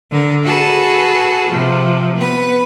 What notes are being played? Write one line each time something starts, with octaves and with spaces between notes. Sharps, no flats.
D3 A#4
F#4 G#4 A4 B4
C3 F3
B3 B4